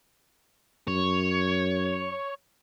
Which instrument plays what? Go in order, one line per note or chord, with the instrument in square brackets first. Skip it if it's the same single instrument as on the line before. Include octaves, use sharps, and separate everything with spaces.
[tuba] F#2 [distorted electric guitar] C#5